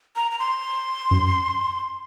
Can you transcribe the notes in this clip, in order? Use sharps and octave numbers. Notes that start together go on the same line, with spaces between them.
A#5
A#5
C6
F#2